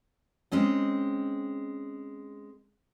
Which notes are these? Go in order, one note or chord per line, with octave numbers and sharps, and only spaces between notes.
G#3 C4 C#4 D#4